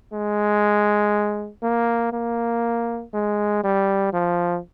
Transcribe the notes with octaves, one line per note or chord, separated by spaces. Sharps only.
G#3
A#3
A#3
G#3
G3
F3